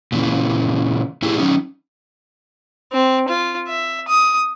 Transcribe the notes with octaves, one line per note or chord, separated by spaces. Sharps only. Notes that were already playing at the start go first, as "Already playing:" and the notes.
A#2 C#3 E3
A2 E4 G4 G#4
F#3 C#4 D#4
C4
F4
E5
D#6